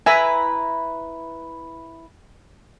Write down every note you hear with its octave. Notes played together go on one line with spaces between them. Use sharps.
E4 B4 E5 G#5 A#5